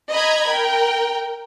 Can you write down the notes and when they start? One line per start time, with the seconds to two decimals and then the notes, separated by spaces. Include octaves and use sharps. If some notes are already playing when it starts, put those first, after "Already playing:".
0.12 D#5 A#5 B5 G#6
0.47 A#4 G5